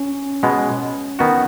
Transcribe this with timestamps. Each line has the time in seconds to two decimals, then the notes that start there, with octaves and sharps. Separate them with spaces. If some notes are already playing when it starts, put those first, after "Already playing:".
Already playing: C#4
0.43 B2 G#3 B3
1.19 D#3 B3 F#4